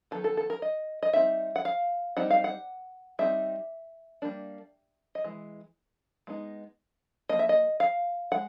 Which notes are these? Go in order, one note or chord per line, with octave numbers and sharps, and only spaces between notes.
D#3 F#3 B3 A4
A4
A4
A#4
D#5
D#5
G3 C4 D#4 E5
F#5
F5
G3 C4 D#4 F#5
F5
F#5
G3 C4 D#4 E5
G3 A#3 D4
D#5
E3 G#3
G#3 B3 D#4
F3 A#3 D#5
E5
D#5
F5
G#3 F#5